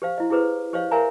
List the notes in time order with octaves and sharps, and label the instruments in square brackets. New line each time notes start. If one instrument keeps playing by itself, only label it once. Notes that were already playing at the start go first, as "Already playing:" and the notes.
[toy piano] G4 C5 F5
E4 D#5
E4 G4 G#4 B4 C5
G4 C5 C#5 D#5 F5
A#4 C#5 E5 F5 G#5 A#5